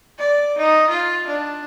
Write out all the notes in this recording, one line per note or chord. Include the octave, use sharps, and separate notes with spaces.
D5
D#4
F4
D4